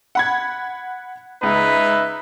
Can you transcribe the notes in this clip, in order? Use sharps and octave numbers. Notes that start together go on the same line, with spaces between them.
F#5 B5 G#6
C#2 D#4 B4 E5